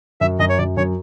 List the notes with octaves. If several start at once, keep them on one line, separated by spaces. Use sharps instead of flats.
F#2 E5
F#2 D#5
C#5
F#2 D5
F#2 C#5